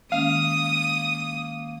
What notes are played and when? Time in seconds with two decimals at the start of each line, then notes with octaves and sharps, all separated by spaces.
0.12 D#3 G#3 A#3 C#4 F5 D#6